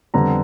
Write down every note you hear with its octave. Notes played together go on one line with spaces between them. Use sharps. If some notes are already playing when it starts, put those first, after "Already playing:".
F2 D3 G3 B3 A#5